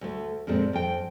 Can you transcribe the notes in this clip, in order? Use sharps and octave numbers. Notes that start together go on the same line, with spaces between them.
D2 A3
F2 A#2 G#3 C4
F2 G5